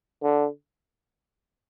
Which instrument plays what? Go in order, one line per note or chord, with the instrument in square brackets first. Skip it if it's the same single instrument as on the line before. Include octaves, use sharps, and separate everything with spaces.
[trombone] D3